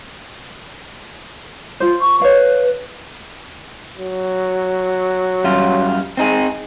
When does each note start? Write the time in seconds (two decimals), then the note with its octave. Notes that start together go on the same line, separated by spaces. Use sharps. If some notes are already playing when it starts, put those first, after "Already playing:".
1.80 F4 C5
2.01 C#6
2.21 B4 C#5 F5
3.98 F#3
5.44 F#2 G3 F4
6.17 C4 D#4 G#4